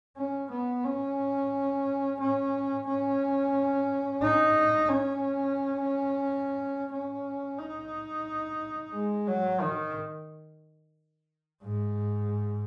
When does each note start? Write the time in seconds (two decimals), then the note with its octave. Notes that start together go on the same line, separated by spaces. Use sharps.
0.18 C#4
0.51 B3
0.84 C#4
2.20 C#4
2.87 C#4
4.22 D#4
4.89 C#4
6.92 C#4
7.58 D#4
8.94 G#3
9.28 F#3
9.61 D#3
11.63 G#2